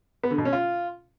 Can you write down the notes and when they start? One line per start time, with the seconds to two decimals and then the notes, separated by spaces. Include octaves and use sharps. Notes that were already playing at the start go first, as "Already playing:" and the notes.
0.24 B3
0.31 D3
0.38 B2
0.45 C#4
0.53 F4